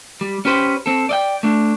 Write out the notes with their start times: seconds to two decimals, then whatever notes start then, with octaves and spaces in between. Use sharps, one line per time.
0.21 G3
0.45 C#4 G4 B4 C5
0.86 C4 A4
1.09 D5 D#5 G5
1.43 A3 D4